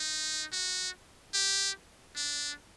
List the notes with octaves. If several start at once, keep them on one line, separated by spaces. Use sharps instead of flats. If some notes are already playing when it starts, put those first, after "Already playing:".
Already playing: D#4
F#4
G4
D4